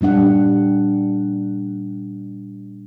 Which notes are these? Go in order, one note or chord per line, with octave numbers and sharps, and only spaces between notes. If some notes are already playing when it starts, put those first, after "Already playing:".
A#2 G3 D4 F#5